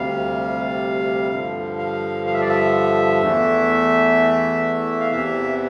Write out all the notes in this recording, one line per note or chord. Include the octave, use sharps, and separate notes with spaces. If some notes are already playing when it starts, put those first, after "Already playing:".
Already playing: D2 C3 G3 F5
G2 D3 F3
F5
F5
E5
D5
E5
E2 E3 A3
F5
E2 C3 E3 E5